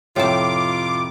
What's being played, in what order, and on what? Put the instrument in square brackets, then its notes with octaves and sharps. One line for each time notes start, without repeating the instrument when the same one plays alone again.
[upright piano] F1 A3 G5 [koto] A2 A5 [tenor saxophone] F4 [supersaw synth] D6